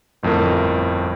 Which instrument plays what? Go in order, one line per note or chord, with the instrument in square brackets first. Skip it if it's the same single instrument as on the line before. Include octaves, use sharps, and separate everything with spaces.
[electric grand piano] G1 F2 A2 A#4